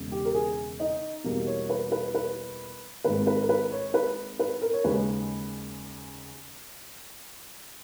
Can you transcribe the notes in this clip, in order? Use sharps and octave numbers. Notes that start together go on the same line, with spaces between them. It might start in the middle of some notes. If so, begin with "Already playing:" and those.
Already playing: E1 C#3
G4
A#4
G#4
D#4
E2 B2 G3 A#3
C#5
B4
B4
B4
G#1 G#2 D#3 A#3 B4
B4
A#4
B4
C#5
B4
B4
A#4
C#5
D#2 C#3 G#3 B4